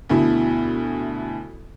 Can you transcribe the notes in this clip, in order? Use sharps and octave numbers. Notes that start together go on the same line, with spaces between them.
D2 B2 E4